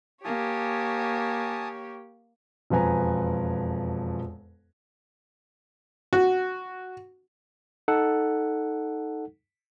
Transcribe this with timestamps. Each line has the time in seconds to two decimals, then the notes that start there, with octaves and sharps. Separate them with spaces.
0.25 A#3 G4 C#5 G#5 A5 D#6
2.70 E1 F2 F3 B4 G#5 A#5
6.13 F#4
7.88 D#4 A4 F#5